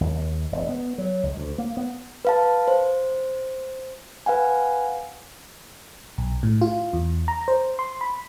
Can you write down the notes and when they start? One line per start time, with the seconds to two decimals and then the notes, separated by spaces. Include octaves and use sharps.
0.01 D#2
0.52 E1
0.69 B3
0.98 F#3
1.23 C#2
1.37 D2
1.58 A#3
1.77 B3
2.25 B4 F5 A5
2.68 C5
4.26 B4 F5 F#5 G#5
6.18 B1
6.43 A2
6.62 F4
6.93 E2
7.28 A#5
7.48 C5
7.79 C6
8.01 B5